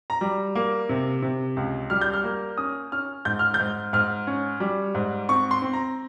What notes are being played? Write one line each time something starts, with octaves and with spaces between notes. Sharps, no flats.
A#5
G3
A#3
C3
C3
C#2
G3 F6
G6
F6
A#3
C#4 D#6
C#4 F6
G#2 G6
F6
G6
G#2
G#2 F6
C#4
G3
G#2
C4 C#6
C6
C4
A#5